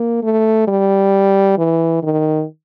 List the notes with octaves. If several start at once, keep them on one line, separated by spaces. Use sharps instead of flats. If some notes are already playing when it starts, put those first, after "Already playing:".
Already playing: A#3
A3
G3
E3
D#3